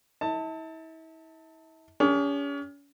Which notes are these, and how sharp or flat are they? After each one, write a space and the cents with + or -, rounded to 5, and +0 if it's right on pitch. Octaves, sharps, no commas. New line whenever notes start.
E4 -40 A5 +20
C#4 +35 G#4 -45